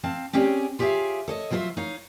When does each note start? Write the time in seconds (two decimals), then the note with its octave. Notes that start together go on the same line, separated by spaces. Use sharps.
0.03 C4 F5 A5
0.33 C4 C#4 G4 G#4 C#5 D5
0.79 F4 G4 G#4 C#5 E5 F5
1.28 A4 C#5 D#5
1.51 F3 F#3 F4 A4 C5 E5
1.77 D#4 C#5 F5